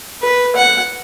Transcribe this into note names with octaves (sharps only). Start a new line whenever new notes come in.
B4
F#5